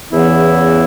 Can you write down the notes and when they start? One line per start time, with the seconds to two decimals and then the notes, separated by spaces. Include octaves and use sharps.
0.10 E2 C#3 E3 B3 E4